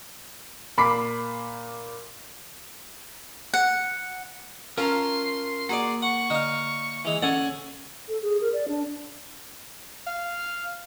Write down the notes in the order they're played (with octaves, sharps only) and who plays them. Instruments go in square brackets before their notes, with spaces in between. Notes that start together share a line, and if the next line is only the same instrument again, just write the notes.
[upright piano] A#2 B5 D6 B6 C7
[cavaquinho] F#5
[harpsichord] C#4 F4 A4 [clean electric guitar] A#4 A#5 [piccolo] C6
[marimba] A#3 [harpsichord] F#4 G#4 D5
[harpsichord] F#5 [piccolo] C#6
[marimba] D3 [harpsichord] D#4 F5
[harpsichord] E3 G#3 [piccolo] F7
[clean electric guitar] C#4 A4 D5 [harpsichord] F#5 [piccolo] G#5
[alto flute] A4
G#4
A#4
D5
D4
[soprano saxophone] F5